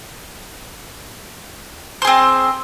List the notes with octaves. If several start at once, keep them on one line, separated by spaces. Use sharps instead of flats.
C4 G#4 C5